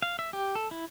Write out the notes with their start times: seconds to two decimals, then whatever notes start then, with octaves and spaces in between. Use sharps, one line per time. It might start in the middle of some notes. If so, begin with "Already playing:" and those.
0.02 F5
0.19 E5
0.33 G4
0.55 A4
0.71 E4